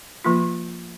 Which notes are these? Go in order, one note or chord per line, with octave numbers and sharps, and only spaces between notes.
F3 A#3 F4